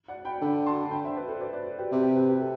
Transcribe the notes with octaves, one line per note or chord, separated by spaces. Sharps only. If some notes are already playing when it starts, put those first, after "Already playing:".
D5 F#5
G5 B5
D3 G5 B5
A5 C6
G5 B5
C5 E5
B4 D5
A4 C5
B4 D5
B4 D5
G4 B4
C3 G4
G4
G4 B4
G4 B4
A4